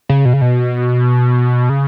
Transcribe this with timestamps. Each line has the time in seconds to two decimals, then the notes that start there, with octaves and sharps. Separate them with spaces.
0.09 C#3
0.25 B2
0.33 C#3
0.41 B2
1.69 C#3